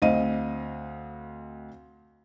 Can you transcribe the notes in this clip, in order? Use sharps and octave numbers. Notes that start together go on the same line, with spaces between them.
D2 C4 D#5 F5 D#7